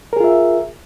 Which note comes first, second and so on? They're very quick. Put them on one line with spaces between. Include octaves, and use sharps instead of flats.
A#4 G#4 F4 E5